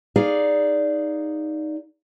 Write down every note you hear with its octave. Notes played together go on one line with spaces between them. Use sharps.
D#4 G#4 D5 F5